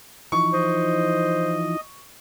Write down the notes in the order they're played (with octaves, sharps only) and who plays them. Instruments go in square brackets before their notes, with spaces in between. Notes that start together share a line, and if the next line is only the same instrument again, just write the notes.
[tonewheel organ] E3 F3 D#4 [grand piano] C#6
[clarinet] C5 [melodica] D#5